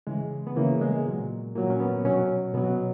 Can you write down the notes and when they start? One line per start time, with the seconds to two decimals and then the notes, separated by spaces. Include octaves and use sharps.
0.07 C#3 E3 G#3
0.47 B3
0.56 C#3 E3 A#3
0.81 G#3
1.06 A#2 F#3
1.55 A#2 A#3
1.58 F#3
1.70 C#4
1.80 B3
2.04 B2 F#3 C#4
2.54 B2 B3
2.58 F#3